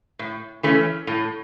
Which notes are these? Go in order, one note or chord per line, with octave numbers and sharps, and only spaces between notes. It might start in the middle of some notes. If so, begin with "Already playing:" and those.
A2
E3 A3 C#4
A2